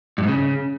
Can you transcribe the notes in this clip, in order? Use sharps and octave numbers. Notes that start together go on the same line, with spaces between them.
G2
G#2
C#3